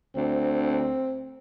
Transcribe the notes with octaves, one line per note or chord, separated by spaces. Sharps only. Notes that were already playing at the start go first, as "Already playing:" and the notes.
D2 C4